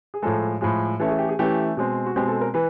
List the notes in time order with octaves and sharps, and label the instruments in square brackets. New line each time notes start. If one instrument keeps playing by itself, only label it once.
[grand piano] G#4
A2 F3 G#3 A4
A2 F3 G#3
E3 A3 C#4 E4 A4
G#4
G4
G#4
E3 A3 C#4 E4 G4
B2 G#3 C4
F#4
B2 G#3 C4 G4
A4
A#4
E3 B4